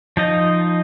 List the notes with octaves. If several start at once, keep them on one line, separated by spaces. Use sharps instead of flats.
F3 D#4 D#5